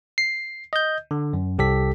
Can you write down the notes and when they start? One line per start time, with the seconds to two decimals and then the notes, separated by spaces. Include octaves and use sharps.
0.18 C7
0.73 D#5 G6
1.11 D3
1.33 F#2
1.59 C2 G4 A4 B6